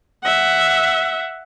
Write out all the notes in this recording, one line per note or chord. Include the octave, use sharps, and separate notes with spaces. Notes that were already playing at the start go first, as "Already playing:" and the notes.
E5 F#5